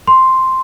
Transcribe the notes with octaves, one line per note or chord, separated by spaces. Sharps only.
C6